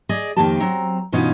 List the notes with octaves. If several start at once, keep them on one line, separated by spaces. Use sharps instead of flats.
G#4 D5 D#5
F2 D#3 A#3 G4 A5
F#3 C4 A#5
G2 B2 E3 C#4 D#4 F4